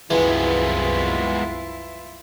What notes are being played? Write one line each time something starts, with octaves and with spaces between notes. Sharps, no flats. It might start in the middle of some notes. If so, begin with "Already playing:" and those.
C2 F#2 E3 G#3 B3 E4 F4